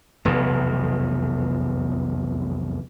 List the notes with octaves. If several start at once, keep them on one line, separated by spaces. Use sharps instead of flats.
F1 B1 E2